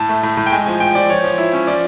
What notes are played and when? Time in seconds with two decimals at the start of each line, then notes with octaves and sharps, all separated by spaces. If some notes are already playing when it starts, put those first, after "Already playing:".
Already playing: A2 A5
0.09 A3
0.23 A2
0.37 A2
0.46 G5
0.52 G#3 G#5
0.66 F3 G#5
0.80 F3 G5
0.95 F3 D5
1.09 F3 C#5
1.24 F3
1.38 E4
1.53 C#4
1.67 F3 D5